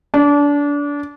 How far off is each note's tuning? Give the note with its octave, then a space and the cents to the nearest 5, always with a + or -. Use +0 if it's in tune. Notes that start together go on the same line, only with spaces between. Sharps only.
D4 -25